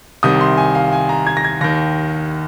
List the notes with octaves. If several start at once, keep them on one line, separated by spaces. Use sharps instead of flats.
C2 C3 D#3 D#6
C6
G#5
F5
G#5
A#5
G#6
A#6
G#6
D#2 D#3 A#6